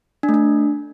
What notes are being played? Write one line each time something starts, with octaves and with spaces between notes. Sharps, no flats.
D4
A3
D4